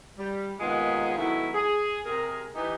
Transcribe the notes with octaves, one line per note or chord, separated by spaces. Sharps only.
G3
D#2 C3 D#3 G#3 B3 F4
D#3 F#3 G#3 A3 B3 E4
G#4
C3 G#4 A#4
E3 D#4 G4